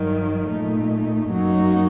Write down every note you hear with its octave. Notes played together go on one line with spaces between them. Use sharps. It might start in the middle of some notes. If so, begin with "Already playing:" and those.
Already playing: G2 D#3 F#3
A#2 A3 D#4
F#2 F#3 A#3 D#4 F#4